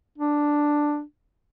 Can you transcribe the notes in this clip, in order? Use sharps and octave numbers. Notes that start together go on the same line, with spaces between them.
D4